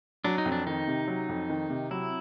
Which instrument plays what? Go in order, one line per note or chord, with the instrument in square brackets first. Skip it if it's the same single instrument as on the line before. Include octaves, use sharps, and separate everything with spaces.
[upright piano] F#3 [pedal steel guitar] D4
[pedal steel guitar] D#4
[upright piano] F2
[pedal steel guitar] D4
[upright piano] D#3 [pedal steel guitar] D#4
[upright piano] C3
F#3
F2
D#3
C3
[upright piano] F#3 [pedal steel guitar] E4